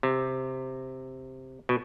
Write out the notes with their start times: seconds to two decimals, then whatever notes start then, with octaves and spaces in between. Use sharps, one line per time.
0.03 C3
1.69 B2